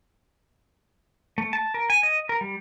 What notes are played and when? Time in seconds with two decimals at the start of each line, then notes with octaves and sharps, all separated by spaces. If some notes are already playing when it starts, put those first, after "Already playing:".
1.38 A3
1.53 A5
1.74 A#4
1.90 G#5
2.03 D#5
2.29 A#4
2.41 G3